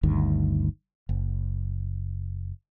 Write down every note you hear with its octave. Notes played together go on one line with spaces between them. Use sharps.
G1 D2 G2 D#3
F#1